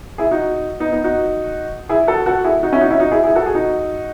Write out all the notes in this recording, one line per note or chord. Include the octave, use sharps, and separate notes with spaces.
E4 G#4
D#4 F#4
B3 D#4
B3 D#4
D#4 F#4
E4 G#4
F#4 A4
F#4 A4
E4 G#4
D#4 F#4
C#4 E4
D#4 F#4
C#4 E4
D#4 F#4
E4 G#4
E4 G#4
F#4 A4
G#4
D#4 F#4